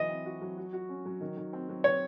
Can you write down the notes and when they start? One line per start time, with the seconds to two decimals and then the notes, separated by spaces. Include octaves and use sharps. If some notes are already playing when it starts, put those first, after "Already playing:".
Already playing: E3 F#3 D#5
0.10 C4
0.26 F#4
0.41 F#3
0.57 F#4
0.73 F#4
0.89 C#4
1.05 F#3
1.21 D#3
1.37 D#3
1.53 C4
1.69 F#3
1.84 C4 C#5